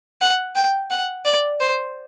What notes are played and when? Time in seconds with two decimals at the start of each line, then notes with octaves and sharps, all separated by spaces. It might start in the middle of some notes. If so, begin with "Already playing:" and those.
0.21 F#5
0.56 G5
0.91 F#5
1.25 D5
1.60 C5